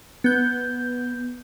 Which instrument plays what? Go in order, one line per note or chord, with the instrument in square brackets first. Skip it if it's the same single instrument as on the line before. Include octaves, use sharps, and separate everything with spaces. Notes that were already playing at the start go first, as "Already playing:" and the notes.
[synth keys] B3 G6